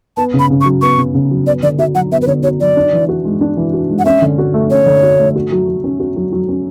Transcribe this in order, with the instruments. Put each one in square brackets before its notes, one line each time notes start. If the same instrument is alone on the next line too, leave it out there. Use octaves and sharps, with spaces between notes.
[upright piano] B3 [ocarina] A5
[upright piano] C#3
[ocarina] B5
[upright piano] C#3
[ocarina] C#6
[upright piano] F#3
[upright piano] B3 [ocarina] C#6
[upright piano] C#3
C#3
F#3
[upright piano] B3 [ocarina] D5
[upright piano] D3 [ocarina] D5
[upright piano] F#4 [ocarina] E5
[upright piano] F#3 [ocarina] F#5
[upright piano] B3 [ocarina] E5
[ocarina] B4
[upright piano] D3 [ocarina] C#5
[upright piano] F#4 [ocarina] C#5
[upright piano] F#3 [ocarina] D5
[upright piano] D4
E3
F#4
G#3
D4
E3
F#4
G#3
[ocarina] F#5
[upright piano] C#4 [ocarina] E5
[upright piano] D3
F#4
A3
[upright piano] C#4 [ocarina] C#5
[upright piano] D3
F#4
A3
F#4
F#3
F#3
C#4
F#4
F#3
F#3
C#4